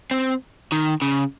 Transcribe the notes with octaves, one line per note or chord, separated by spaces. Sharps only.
C4
D#3
C#3